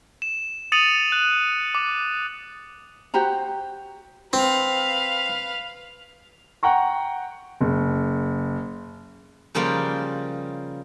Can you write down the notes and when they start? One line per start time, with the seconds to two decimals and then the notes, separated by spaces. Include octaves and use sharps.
0.22 E7
0.72 D#6 A6 C#7 D#7 F7 F#7
1.12 F#6
1.75 D6
3.14 F#4 G4 C5 A#5
4.33 C4 B4 F5
6.63 F#5 G5 A#5 C#6
7.61 F#1
9.55 C#3 F3 G3 A#3 F4